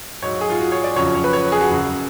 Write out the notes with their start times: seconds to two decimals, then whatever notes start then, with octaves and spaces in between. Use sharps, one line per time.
0.22 G#2 F#3 C#5
0.41 G#4
0.50 F4
0.60 F#4
0.72 C#5
0.84 D5
0.96 F2 C#3 F#3 C#5
1.15 C#5
1.24 B4
1.33 C#5
1.52 G#4
1.61 F#4
1.70 F#2 C#3 F#3